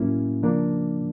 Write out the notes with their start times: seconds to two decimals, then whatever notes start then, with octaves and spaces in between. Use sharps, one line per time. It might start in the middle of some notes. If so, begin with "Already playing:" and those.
Already playing: A2 F#3 A#3 C#4 E4
0.42 C#3 F3 A#3 D4